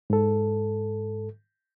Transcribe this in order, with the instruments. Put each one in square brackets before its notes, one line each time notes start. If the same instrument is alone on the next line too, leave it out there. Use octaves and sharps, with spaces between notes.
[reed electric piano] G#2 A4